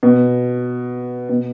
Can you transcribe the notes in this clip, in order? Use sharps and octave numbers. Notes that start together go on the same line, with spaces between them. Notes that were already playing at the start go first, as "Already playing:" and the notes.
B2
B2